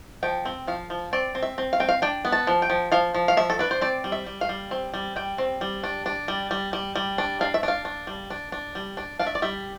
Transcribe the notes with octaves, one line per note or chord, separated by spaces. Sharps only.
F3 G5
C4
F3 F5
F3
C4 D5
C4
E5
C4
F5
C4 G5
F5
D4 G5
B3
A5
F3
G5
F3
F3 F5
F3
F5
F3 E5
A4
D4 B4
C5
C4 D5
G3
E5
G3
F5
G3
C4
G3
G3 G5
C4
G3
D4
D4
G3
G3
G3
G3
D4
D4 F5
E5
D4 F5
D4
G3
D4
D4
G3
D4
D4 F5
E5
D5
G3 E5